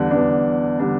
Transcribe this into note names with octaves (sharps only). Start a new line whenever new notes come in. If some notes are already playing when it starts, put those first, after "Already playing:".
Already playing: E2 D3 G3 D4
E2 D3 G3 D4
D3 G3 D4